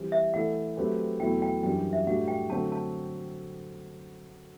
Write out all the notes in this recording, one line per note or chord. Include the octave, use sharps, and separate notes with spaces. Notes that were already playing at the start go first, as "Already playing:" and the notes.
Already playing: E3 G3 C4 G4 C5
E5
E3 A3 E4 A4 D5 F#5
F#3 A3 C4 G4 B4
E2 B2 F#3 A3 E4 G5
G5
F#2 E3 G3 D4 G5
E5
A2 G3 D4 F#4 F#5
G5
D3 F#3 A3 C4 F#4 A5
A5